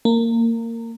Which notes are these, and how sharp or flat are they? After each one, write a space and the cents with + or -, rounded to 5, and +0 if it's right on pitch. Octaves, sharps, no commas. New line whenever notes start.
A#3 -20